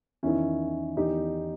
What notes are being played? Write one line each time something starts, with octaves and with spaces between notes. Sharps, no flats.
E2 D#3 C#4 E4
E2 D#3 D#4 G4